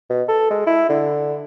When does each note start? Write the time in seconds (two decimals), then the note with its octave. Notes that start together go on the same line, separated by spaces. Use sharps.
0.10 B2
0.28 A4
0.50 G#3
0.67 E4
0.89 D3